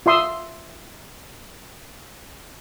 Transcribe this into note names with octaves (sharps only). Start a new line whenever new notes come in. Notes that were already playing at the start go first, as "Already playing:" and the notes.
F4 E5 C6 D#6 E6